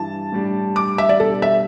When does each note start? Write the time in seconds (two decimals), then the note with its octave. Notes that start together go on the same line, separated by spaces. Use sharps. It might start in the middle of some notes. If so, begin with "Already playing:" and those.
Already playing: G2 E3 G3 A5
0.32 A2 G3 D4
0.76 D6
0.98 E5
1.09 D5
1.20 B2 G3 D4 G4 A4
1.42 E5